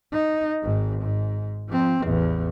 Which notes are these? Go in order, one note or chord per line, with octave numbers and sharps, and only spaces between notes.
D#4
G#1 G#2
G#2
F3 C4
A1 E2